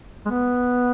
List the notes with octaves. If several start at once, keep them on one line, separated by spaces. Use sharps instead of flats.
G#3
B3